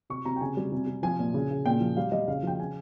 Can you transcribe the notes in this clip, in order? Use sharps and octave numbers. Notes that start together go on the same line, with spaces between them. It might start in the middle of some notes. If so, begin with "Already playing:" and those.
C3 C#6
C3 A#5
G5
C#3 G#5
G3
C3
C3
F3 G#5
A#2
C#3
C#3
A#2 G5
F3
G3 F5
G3 D#5
C#3 F5
F3 G5
C#3 G#5